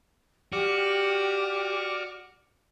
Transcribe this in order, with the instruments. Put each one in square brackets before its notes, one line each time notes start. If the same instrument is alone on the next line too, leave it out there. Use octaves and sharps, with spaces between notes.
[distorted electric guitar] F#4 [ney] G4 [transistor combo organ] D5 D6 F6